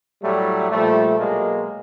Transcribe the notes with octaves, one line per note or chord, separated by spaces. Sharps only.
A2 F#3 G3 A3
A#2 F3 G3 A3
B2 F#3 G#3 A#3